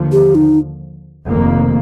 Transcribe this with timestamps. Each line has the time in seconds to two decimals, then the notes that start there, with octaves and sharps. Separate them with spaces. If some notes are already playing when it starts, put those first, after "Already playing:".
Already playing: D#2 D3 F3
0.12 G4
0.35 D#4
1.27 F1 F2 D#3 A#3